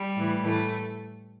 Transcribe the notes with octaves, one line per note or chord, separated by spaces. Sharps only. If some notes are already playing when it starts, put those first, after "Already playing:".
Already playing: G3
A2 E3
A2 E3 A3